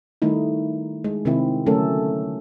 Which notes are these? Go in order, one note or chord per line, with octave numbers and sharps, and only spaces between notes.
D#3 G3 A3 D#4 E4
G#3
C3 D#3 C4 E4
D3 F#3 A3 C#4 A4 A#4